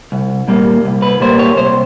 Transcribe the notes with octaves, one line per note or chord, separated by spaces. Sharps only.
C2
A#2 G3 A#3
C2
B4
A#2 G3 A#3 C5
C#5
C2 C5